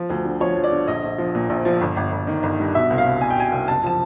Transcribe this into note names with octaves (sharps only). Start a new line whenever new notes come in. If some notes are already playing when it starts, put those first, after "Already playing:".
Already playing: F3
D2
D3
F3 C#5
F3
D5
D3
A#1 D#5
A#1
F3
A#2
A#1
F3
G1
G1
G1
D#3
G1
G2
B2 E5
C2
F5
C2
C2 G#5
G5
B2 G#5
C2
F#1 A5
F3 A5